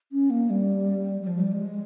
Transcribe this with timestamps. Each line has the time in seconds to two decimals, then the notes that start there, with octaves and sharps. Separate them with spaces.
0.12 C#4
0.30 A#3
0.50 G3
1.21 G3
1.27 F3
1.40 G3
1.52 G#3